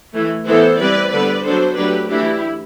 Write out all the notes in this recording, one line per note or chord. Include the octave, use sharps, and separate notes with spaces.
E3 A3 E4
E3 B3 E4 A4 C5
G3 C4 E4 B4 D5
D3 G3 B3 B4 D5
F#3 B3 D4 A4 C5
F#3 A3 D4 G4 B4
E3 A3 D4 E4 G4